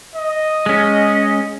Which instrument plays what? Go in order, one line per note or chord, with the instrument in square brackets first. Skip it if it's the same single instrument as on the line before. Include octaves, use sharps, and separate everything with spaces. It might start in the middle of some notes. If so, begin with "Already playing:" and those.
[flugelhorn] D#5
[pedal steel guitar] G#3 C#4